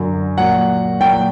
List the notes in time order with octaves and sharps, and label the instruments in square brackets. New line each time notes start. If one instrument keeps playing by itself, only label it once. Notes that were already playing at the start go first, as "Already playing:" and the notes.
Already playing: [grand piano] F#2 D3 F#3
A#2 F#3 F#5
A#2 F#3 G5